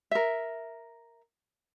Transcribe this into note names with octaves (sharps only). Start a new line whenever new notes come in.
A#4 E5